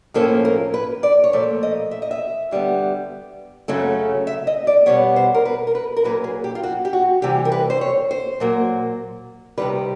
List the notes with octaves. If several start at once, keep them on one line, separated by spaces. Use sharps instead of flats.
A2 F3 A#3 C#4 A4
A#4
B4
D5
C#5
A#2 F3 A3 D5
D#5
E5
D#5
E5
D3 G3 B3
F#2 C#3 F#3 A3 C#4
E5
D#5
D5
B2 G3 B3 C#5
C5
A#4
B4
A#4
B4
A#4
A#2 F#3 A#3 B4
G#4
G4
F4
F#4
G4
F#4
C3 E3 G3 G4
A#4
B4
C5
C#5
C5
A#2 F#3 A#3
C3 D#3 G3 B4